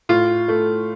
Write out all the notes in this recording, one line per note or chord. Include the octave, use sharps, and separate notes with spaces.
A2 F4
A3